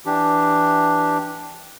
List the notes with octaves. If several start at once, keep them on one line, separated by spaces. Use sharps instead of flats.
E3 D4 G4